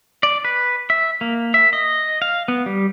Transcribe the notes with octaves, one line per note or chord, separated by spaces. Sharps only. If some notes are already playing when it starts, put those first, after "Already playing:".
D5
B4
E5
A#3
E5
D#5
F5
B3
G3